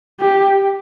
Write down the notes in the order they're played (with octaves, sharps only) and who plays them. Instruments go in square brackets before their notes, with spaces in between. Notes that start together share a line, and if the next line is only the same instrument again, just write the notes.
[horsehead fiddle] G4